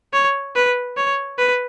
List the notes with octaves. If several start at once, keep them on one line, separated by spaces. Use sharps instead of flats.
C#5
B4
C#5
B4